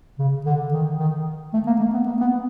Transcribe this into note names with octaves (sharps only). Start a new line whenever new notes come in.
C#3
D3
D#3
D#3
A3
A#3
A3
B3
A#3
B3